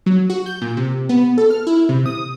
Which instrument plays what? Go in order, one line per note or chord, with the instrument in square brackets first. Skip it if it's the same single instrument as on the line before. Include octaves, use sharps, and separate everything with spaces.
[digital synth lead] F#3
F#4
G6
A#2
C3
B3
A4
F6
E4
C3
D#6